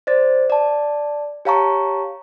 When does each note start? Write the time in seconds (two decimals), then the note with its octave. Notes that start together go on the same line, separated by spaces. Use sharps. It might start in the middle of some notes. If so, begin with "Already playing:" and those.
0.07 C5 D5 A6
0.50 D5 A5
1.45 G4 C#5 F5 A5 A#5 C#6